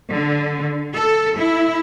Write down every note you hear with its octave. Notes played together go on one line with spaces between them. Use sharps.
D3
A4
E4